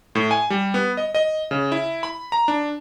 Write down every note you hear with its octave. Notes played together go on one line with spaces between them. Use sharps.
A2
G#5
G3
B3
D#5
D#5
C#3
E4
B5
A#5
D4